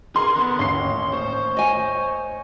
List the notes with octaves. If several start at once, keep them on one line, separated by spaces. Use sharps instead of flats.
G#4 A#4 C6
D3 B3
A1 D#2 C#5 C6 C7
C5 C#5
D#5 G#5